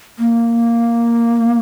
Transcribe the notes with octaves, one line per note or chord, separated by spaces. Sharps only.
A#3